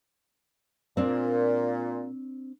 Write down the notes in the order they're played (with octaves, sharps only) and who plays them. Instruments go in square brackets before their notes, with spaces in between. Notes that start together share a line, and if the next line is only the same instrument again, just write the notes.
[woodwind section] A#2 [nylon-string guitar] C4 D4